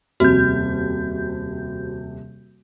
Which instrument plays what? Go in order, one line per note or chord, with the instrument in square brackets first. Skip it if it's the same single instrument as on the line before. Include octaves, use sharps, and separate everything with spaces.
[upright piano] D#1 F2 C3 [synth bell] F#4 G6